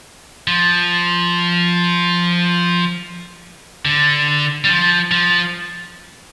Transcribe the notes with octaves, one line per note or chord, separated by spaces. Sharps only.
F3
D3
G3
F3
F3